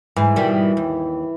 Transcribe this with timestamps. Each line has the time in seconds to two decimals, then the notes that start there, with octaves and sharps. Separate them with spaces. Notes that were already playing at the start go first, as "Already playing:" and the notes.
0.17 G#2 E3
0.36 B2 D#3 G3
0.77 D#2